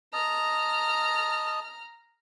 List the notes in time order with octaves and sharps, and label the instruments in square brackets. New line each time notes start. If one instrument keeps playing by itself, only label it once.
[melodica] D#5 A5 [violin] A#5 F6